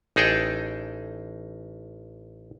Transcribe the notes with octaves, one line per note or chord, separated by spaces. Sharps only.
A1 D#4 G#4 A4 G5